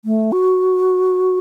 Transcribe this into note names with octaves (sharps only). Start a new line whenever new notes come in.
A3
F#4